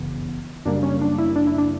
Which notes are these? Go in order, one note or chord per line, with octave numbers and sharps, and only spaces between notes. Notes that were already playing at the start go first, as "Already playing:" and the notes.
Already playing: G1 F#2 C#3 E3 B3
F#2 C#3 G3 A#3 D4
C#4
D4
E4
D4
E4
D4